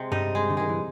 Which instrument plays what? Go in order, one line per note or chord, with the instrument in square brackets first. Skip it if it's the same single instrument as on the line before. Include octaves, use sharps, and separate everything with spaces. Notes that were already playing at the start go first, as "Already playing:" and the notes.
Already playing: [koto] C3 G#3
[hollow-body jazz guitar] G2 G3 [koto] D#4
[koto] G#3
[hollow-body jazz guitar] D3
[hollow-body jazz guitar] D#3 [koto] G#3
[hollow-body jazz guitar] E3